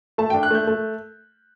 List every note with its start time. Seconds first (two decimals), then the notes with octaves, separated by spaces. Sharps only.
0.18 A3 A5
0.30 D4 G5
0.43 F#6
0.51 A3 G6
0.67 A3